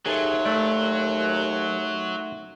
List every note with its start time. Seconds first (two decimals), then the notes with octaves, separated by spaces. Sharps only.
0.06 D#2 F#3 D#4 G#4 A4 E5 C6
0.45 A3 D5